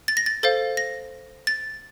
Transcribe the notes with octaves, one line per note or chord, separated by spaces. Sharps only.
A6
A#6
A6
A4 C5 F5 A6
A#6
A6